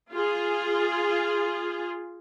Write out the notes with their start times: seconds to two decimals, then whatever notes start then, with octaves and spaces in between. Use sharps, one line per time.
0.12 F4 G#4